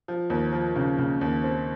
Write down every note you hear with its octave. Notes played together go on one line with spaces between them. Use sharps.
F3
D#2
F3
C#3
C#3
D#2
C4